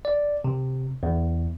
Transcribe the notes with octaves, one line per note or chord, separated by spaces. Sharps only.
D5
C3
E2